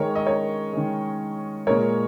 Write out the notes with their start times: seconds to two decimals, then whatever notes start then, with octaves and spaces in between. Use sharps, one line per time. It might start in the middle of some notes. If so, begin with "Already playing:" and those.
Already playing: D#3 G#3 A#4 C#5
0.15 D#5
0.27 A#4 C#5
0.73 D#3 G#3
1.67 A#2 G#3 A#4 C#5